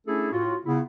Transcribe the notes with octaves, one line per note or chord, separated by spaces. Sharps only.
A3 C#4 D4 E4 G#4 A4
A2 F4 F#4
C#3 B3 E4